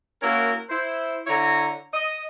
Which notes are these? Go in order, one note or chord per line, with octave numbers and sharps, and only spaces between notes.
A#3 C#4 E4 F#4 A#4
E4 C5
D3 E4 C#5 A#5
D#5